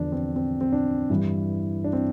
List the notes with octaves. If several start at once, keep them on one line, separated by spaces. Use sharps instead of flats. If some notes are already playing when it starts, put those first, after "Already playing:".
Already playing: E2 D3 F3 D4
C4
C4
C4
D4
G2 E3 G3 E4
D4
C4